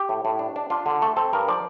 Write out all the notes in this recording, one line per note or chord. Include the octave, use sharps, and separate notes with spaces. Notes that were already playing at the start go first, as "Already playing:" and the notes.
Already playing: G4
A2
A2
D4
D4
D4 F4
D3
A3 A4
C4 A4
G2 A#4
F3 D5